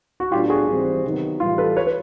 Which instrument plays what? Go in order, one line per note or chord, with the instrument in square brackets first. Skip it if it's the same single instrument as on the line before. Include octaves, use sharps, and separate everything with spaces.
[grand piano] F#4
[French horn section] A2 F#3 B3 D4 [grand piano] F4 G4
[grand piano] F#4 G#4
[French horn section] G#2 E3 G3 C4
C3 D#3 F#3 B3 D#4
[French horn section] A2 E3 G3 [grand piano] F4
[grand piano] A4 B4
B4 C#5
B4